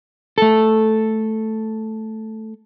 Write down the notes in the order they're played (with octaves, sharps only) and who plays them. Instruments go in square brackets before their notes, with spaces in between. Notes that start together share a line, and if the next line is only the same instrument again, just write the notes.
[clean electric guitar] A3 A4